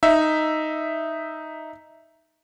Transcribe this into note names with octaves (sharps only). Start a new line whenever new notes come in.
D#4 E5